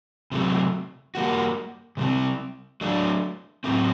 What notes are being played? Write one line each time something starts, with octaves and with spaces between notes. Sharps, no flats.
C3 F#3 A3
G3 A#3 F#4
C3 G3 C4
F#3 A3 D4
A2 F#3 A3 C4